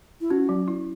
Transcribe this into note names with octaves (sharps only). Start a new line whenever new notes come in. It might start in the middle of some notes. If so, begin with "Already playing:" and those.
E4
C#4 F#4
F#3
E4